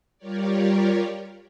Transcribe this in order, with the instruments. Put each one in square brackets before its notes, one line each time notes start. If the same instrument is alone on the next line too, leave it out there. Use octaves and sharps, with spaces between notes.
[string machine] G3 F4 G4 A#4 C#5 D5